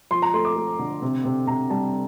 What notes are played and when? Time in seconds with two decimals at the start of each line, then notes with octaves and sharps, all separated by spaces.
0.11 F3 C6
0.22 A#5
0.34 A3 C6
0.45 D6
0.56 A3
0.79 D3
1.02 C3
1.25 C3
1.47 C3 A#5
1.70 G3 A5